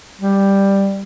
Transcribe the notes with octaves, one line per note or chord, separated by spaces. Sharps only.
G3